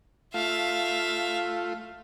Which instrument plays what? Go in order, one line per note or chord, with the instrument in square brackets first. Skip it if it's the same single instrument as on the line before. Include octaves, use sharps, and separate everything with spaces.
[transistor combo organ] A3 F4 [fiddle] E5 F5